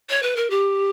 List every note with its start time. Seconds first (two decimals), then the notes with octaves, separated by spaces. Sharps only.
0.09 C#5
0.22 B4
0.36 A#4
0.50 G4